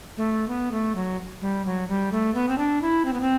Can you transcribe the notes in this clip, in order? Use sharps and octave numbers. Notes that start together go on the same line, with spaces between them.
A3
B3
A3
F#3
G3
F#3
G3
A3
B3
C4
D4
E4
C4
B3
C4